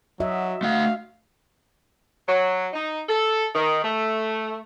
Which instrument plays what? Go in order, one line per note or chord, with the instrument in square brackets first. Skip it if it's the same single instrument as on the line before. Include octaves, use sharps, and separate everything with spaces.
[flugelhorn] F#3 [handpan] F#4 D#5 E5
[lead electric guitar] A3 F#5 [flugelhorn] F5
[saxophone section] F#3
D#4
A4
D#3
A3